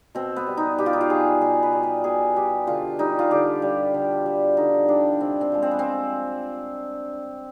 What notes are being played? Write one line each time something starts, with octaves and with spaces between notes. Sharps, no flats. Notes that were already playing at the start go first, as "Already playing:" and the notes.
B2 C4
B3
G3
D#4
B2 G4
F4
D#4
F4
G3 G#4
B2 G#4
B4
G3
B4
B2 G#4
G3 G4
D3 F4
G3 D#4
F4
D3 G4
G3
D3
G3
D3 D#4
G3 D4
C3 C4
C4
F3 G#3
C4
B3
C4